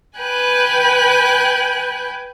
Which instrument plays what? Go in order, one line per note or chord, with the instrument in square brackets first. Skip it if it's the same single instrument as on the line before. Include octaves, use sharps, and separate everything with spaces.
[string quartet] B4 G5 G#5 B5 F#6